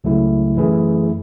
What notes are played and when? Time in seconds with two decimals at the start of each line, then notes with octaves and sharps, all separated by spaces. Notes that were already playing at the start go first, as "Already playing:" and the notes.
0.04 C#2 C#3 F#3 A3 E4
0.56 F#2 E3 A3 E4 G#4